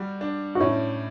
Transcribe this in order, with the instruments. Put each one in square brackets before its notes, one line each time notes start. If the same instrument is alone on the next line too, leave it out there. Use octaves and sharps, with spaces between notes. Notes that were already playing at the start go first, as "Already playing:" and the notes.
Already playing: [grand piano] G3 F#4
D4
[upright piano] F#4
[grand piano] A2 [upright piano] C#4 E4